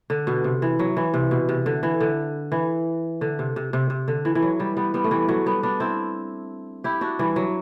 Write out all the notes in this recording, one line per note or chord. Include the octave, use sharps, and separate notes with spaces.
D3
B2
C3
E3
F#3
E3
C3
B2
C3
D3
E3
D3
E3
D3
C3
C3
C3
C3
D3
E3
E3
F#3
E3 G3
G3 B3
G3 B3
A3
E3 G3
F#3 A3
G3 B3
B3 D4
C4 E4
E4 G4
D4 F#4
E3 G3
F#3